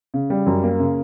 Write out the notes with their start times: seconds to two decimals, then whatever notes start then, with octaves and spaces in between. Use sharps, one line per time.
0.14 C#3
0.30 G3
0.46 F#2
0.63 A#3
0.80 C#3